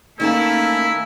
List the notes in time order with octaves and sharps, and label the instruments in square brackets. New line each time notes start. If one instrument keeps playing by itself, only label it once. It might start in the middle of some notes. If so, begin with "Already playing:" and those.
[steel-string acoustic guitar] D#3 G5 A5 [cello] A3 C#4 [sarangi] A#3 [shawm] E4